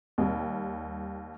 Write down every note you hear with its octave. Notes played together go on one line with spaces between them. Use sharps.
D#2 G3